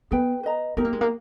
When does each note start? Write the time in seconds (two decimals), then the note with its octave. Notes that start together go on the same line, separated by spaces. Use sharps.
0.11 B3 G#4 B4 G5
0.43 B4 D#5 A#5
0.77 B3 D#4 G4 A#4
0.85 A#3
0.93 G#3
1.01 A#3